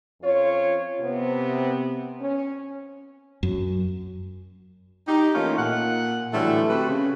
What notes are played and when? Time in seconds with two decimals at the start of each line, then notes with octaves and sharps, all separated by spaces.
0.21 F2 C#4 F4 C#5
1.00 C3 B3 C4
2.20 C#4
3.43 F#2
5.07 D#4 G4
5.35 E3 A3 A#3 C#4 D#4 F4
5.58 A#2 F#5
6.33 A2 D3 E3 F#3 G3 A3
6.69 C4 F#4 G4 A4 B4
6.88 C#3